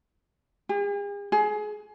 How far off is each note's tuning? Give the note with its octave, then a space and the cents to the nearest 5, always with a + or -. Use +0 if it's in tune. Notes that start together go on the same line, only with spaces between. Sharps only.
G#4 -45
G#4 +25